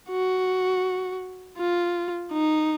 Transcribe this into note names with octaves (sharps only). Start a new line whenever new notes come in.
F#4
F4
D#4